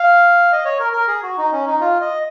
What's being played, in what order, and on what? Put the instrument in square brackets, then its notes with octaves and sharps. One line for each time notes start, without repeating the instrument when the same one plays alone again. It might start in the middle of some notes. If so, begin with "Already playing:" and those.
Already playing: [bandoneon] F5
D#5
C#5
A#4
A#4
G#4
F#4
D#4
C#4
D#4
F4
D#5